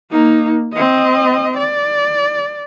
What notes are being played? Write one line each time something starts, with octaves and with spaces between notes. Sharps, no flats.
A#3 D#4
C4 D#5
D5